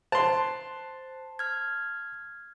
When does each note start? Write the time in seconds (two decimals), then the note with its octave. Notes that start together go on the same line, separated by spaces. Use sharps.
0.12 C5 A5 C6
1.39 F6 G#6